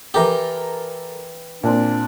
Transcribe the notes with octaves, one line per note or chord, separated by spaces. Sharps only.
E3 G4 A4 A#4 A#5
A#2 C4 D4